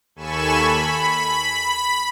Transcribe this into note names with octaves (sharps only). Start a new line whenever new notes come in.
D#2 A4 G#5 B5 C#6 E7
B5